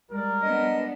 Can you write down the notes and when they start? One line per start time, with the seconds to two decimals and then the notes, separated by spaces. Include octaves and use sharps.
0.11 G3 G#3 A#4 D5
0.42 B3 D4 D#5